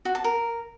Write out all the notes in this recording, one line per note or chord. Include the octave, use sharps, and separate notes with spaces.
F#4
A5
A#4